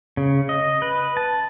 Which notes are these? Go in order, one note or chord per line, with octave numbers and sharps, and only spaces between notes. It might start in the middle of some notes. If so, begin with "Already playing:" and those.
C#3
D#5
B4
A5